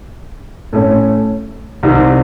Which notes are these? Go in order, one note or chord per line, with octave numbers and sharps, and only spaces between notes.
A2 A3 C#4
C2 C3 D#3